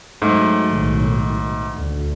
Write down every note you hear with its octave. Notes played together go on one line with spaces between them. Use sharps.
G#2 F#3 A3
B1 A2 D#3
D2